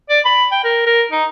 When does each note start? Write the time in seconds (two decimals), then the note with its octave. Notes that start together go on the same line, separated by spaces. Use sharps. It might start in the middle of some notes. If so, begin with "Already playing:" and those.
0.10 D5
0.25 B5
0.52 G5
0.64 A#4
0.86 A#4
1.11 D#4